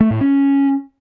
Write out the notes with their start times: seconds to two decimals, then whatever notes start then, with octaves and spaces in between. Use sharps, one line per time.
0.01 A3
0.11 A2
0.21 C#4